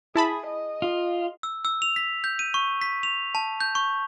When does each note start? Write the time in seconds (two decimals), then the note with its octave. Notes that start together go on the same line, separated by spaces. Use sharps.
0.15 E4 G#4 A5 B5
0.47 D#5
0.82 F4
1.43 E6
1.65 E6
1.82 F7
1.96 B6
2.24 G6
2.39 D#7
2.54 C#6
2.81 B6
3.03 F7
3.35 A5
3.60 G6
3.75 C#6